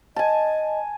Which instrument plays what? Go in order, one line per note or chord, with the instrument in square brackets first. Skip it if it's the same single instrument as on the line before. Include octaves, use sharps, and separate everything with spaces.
[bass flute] D#5 [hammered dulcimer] G#5 A5